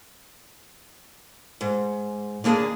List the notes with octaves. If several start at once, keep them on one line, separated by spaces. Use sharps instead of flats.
G#2
D#2 A#3 D4 G#4 A5